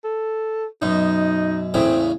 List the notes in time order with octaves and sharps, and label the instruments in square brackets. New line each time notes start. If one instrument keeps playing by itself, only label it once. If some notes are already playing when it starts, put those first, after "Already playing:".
[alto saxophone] A4
[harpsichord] F#2 B2 [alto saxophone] D#4
[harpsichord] E2 A2 C#3 [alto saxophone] C4